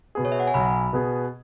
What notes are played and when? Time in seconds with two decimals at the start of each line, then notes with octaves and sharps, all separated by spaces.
0.15 B2 B3 G#4
0.25 C#5
0.32 E5
0.40 F#5
0.47 G#5
0.54 B1 B5
0.93 B2 B3 G#4